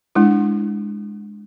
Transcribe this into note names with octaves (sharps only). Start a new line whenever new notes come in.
G#3 D4 E4